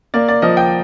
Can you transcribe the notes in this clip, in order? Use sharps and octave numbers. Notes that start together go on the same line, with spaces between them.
A#3 D5
D5
F3 D#5
G5